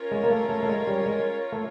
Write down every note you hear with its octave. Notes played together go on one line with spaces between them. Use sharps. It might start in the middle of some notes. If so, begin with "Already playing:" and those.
Already playing: C#4 F4 A#4 C#5
G#3
A#3
A3
A3
A3
G#3
G3
G#3
A3